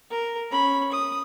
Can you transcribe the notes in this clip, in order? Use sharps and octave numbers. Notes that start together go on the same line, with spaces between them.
A#4
C#4 B5
D#6